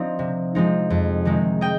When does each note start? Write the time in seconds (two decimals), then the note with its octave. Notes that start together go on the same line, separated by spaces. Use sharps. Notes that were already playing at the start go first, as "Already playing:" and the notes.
Already playing: F3 C4 D#4 D5 F5
0.19 C3
0.55 F3 G#3 C4 D#4
0.90 F2
1.25 C3 D#3 G#3 D#4
1.61 D#5 G5